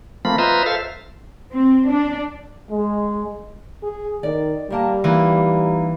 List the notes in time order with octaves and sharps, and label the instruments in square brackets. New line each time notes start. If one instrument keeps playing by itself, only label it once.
[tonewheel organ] F3 A3 A#3 C4 B5
F4 B4 C5 D#5 E5 A#5
A4 C5 E5 F5
[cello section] C4
D4
[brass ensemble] G#3
[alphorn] G#4
[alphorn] D#3 [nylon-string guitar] D5
[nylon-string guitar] D#3 A#3 A5 [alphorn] G3
[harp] E3 [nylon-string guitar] A#3 D#4